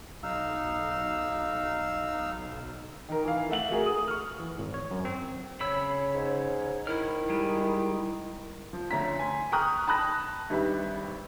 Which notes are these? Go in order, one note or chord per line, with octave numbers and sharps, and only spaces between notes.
B1 D#4 F5 E6
D#3 A#4
E3 F5
A3 E5 F#5 F#7
A3 F#4 G#4 A#4
D#6
C#6 F6
E3
G#1
C#5
F#2
C4
C#3 C#5 B5 E6
G#2
D#3 E4 F6
G3 G#3
F3
D2 A3 C#4 A#5 B6
G#5 C6
G5 A#5 C#6 D#6 F6 F#6
A5 B5 D#6 F#6 A#6
G#1 G2 G4 B4 E5